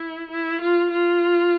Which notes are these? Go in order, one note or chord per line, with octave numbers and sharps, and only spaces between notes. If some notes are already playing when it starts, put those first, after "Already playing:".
Already playing: E4
E4
F4
F4